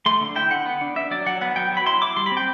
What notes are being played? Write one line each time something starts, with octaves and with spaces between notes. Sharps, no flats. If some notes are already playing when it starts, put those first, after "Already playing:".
A3 C6
D3
E4 G5
D3 F#5
B3
D4
D4 E5
F#3 D5
F#3 F#5
B3 F#5
F#3 G5
F#3
B5
E4 C6
E4 D6
G3 C6
B5
C4
G5